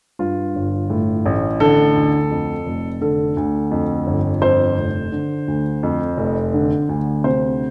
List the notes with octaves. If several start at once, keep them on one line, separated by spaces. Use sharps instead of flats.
G2 F4
G1
A2
A1
D3 A4
D2
F2
F1
D3 A4
D2
F2
G1
F2 C5
F1
D3
D2
F2
F1
D3
D2
C3 C5